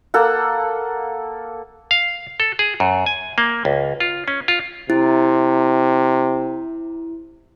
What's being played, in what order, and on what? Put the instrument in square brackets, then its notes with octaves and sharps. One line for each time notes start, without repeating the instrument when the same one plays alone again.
[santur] A#3 A4 F#5
[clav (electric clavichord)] F5
A4
G#4
F#2
G#5
A#3
C#2
F4
C#4
F4
[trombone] C3 [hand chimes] E4